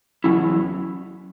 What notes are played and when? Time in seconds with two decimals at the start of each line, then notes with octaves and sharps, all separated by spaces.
0.24 E2 C#3 F#3 C#4 E4